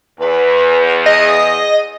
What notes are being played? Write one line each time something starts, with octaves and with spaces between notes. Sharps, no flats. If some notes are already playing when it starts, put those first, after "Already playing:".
E2 B4
G#4 D#5